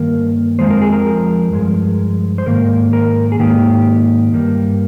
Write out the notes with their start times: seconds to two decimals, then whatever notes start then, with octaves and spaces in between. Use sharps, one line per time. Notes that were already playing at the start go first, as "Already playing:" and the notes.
Already playing: G2 D#3 A#3 A#4
0.59 F2 C3 F3 G#3 C5
0.70 A#4
0.82 G#4
0.93 A#4
1.53 G2 F3 G#3
2.38 C5
2.46 G#2 D#3 A#3 A#4
2.93 A#4
3.32 G#4
3.39 G#2 D#3 A#3 G4
4.33 G2 G3 A#3